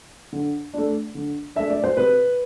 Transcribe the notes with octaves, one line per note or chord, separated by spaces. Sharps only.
D3
A3 D4
D3
A3 D4 E5
D5
C5
C3 B4